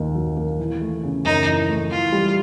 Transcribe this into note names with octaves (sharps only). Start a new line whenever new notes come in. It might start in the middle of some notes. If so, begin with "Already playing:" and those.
Already playing: D#2 D#3 A#3
F#3
A#3
E3
A3
C#3
F#2 D#4
E3
A3
E3 F4
G3